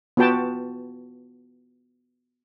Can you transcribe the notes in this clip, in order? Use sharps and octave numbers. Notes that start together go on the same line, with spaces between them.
B3 F4 F#4 B4 G5 A5